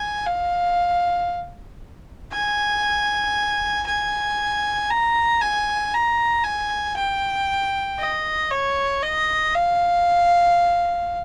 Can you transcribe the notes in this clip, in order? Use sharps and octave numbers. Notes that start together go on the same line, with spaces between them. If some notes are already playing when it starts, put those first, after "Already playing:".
Already playing: G#5
F5
G#5
G#5
A#5
G#5
A#5
G#5
G5
D#5
C#5
D#5
F5